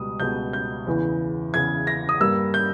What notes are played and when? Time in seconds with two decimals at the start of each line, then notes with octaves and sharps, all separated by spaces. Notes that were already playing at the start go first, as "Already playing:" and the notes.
Already playing: C#2 B2 G3 D#6
0.20 C#2 B2 G3 G6
0.53 G6
0.87 E2 C#3 E3
1.54 E2 C#3 E3 G#6
1.87 A#6
2.09 D#6
2.20 G2 G3 A#3 E6
2.54 G6